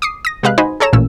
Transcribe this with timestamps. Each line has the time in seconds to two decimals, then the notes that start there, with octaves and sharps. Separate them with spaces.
0.02 D6 D#6 C7
0.25 D#6 A#6
0.43 C3 G#3 B4 F5 F#6
0.58 D#4 F#4 C5 D#5 G#5 B5
0.80 G#4 A4 C#5 A#5 E7
0.93 A1 A#2 C#4 E6